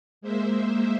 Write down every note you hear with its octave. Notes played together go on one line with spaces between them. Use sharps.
G#3 A#3 C5 E5